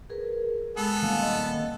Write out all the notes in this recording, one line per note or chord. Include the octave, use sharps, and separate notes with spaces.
G#4 A#4 B4
G#3 B3 A4 E6
D#3 G3 A#3 F5 G#5
C4 D#5